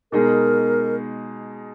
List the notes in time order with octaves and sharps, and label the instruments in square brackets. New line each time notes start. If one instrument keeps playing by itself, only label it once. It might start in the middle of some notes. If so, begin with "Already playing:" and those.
[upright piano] B2 G#3 D#4 G#4 [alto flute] A#4